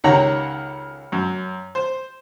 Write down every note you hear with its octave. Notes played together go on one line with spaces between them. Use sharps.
C#2 D#3 G4 C#5 F#5 A#5
F#2
C5